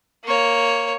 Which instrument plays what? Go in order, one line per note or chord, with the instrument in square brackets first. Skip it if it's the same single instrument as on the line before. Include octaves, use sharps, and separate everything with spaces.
[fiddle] A#3 C#5